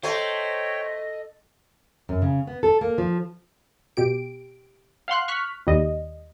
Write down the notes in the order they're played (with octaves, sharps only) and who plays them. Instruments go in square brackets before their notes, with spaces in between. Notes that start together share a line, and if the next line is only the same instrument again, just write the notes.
[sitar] A3 [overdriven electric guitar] C5 [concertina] C#5 G5 [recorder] D#5
[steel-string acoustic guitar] F#2
C#3
B3
A4
A#3
F3
[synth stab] B2 G4 D7
F5 F#5 C6 F#6
C#6 F6 F#6 B6
D#2 G3 D#5